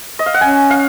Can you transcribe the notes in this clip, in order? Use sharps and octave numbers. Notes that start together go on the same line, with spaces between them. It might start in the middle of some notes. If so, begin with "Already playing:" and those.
D#5
F5
F#5
C#4 G#5
F5